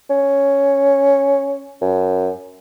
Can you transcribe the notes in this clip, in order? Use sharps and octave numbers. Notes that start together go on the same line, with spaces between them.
C#4
F#2